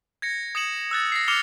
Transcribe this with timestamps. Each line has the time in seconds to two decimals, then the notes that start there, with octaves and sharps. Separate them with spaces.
0.22 G#6 A#6 C#7
0.55 D#6 G#6 C#7 E7 F#7
0.91 E6 F#6 A6
1.12 A#6 C7
1.28 D6 F6 C#7 F7 G7